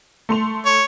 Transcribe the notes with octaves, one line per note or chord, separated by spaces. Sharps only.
A3 C6 F7
C#5